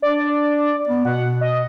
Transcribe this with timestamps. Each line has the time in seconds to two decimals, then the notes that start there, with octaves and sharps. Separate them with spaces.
0.02 D4 D5
0.87 B3
1.05 B2 F#5
1.41 D#5